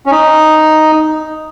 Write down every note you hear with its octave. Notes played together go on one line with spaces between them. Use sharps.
C#4
D#4